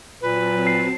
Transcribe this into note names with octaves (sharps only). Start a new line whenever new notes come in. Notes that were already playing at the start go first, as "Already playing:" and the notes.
A#2 F#3 C4 B4 A5
C7